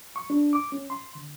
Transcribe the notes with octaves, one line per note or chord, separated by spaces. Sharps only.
C#6
D4
D6
C#4
C6
D3